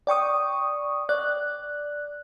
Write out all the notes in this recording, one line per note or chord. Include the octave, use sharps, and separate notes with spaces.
D5 G5 C#6 D#6
D5 F#6